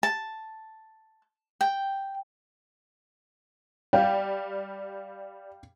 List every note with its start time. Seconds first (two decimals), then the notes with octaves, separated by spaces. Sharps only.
0.03 A5
1.61 G5
3.93 G3 F5 G5